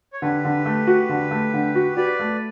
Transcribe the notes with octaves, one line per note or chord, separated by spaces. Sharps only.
C#5
D3 G4 B4
D3
A3
F#4
D3
A3
D3
F#4
F#4 B4 D5
A3